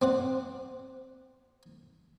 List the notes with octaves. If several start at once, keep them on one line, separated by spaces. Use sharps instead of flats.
C4 D5 F#5